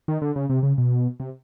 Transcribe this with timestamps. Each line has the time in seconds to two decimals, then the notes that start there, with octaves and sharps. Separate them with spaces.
0.08 D#3
0.22 D3
0.36 C#3
0.50 C3
0.63 C#3
0.78 B2
1.20 C3